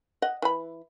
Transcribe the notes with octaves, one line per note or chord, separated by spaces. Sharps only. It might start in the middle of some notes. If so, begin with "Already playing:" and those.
D#5 F#5
E3 B5